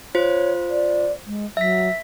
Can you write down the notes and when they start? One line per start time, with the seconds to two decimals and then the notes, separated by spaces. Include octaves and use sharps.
0.15 F4 C5 C#5
0.70 D5
1.26 G#3
1.57 F#3 E5 B6